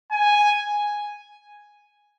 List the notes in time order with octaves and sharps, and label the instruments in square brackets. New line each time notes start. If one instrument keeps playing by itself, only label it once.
[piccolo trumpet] G#5